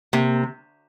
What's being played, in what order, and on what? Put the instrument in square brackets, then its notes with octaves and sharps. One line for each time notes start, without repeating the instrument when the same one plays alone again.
[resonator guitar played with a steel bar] C3 [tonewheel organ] A#3